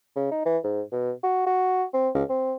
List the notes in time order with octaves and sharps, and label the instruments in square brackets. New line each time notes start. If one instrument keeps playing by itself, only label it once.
[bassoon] C#3
D#4
E3
G#2
B2
F#4
F#4
C4
C#2
C4